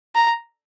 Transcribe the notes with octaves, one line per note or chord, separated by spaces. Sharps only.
A#5